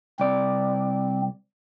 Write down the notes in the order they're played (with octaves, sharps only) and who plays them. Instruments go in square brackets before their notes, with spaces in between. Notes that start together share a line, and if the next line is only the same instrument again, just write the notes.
[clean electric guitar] C2 D5 [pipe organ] C4